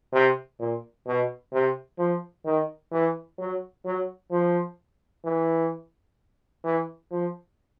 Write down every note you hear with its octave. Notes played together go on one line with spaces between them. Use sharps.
C3
A#2
B2
C3
F3
D#3
E3
F#3
F#3
F3
E3
E3
F3